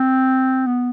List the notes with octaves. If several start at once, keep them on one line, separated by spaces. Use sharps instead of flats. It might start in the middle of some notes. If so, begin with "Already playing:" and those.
Already playing: C4
B3